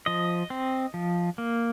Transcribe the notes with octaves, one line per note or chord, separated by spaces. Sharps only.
F3 D#5
C4
F3
A#3